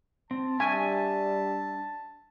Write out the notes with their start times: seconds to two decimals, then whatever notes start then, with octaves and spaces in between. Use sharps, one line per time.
0.31 C4 A5
0.60 G3 D4 E5 G#5 C#6